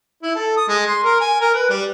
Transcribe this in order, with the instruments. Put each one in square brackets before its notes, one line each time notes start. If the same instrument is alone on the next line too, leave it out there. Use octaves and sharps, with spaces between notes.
[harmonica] E4
A4
D#6
G#3
C6
A#4
G#5
A#4
B4
G3